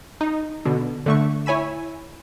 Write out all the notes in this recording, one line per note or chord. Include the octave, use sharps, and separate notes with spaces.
D#4
B2 D3
D3 A3 C#6
E4 C#5 G#5 B5 E6